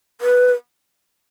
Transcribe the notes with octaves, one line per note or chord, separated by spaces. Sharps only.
B4